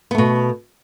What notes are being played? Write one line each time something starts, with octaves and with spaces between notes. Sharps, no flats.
B2 A3 B3